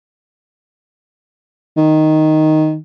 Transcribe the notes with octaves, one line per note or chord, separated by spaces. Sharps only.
D#3